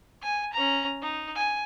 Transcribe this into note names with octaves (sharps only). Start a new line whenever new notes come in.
G#5
C#4 A#5
D#4
G#5